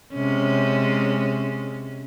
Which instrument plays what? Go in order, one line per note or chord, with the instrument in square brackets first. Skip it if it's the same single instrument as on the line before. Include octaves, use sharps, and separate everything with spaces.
[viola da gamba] C3 G#3 C#4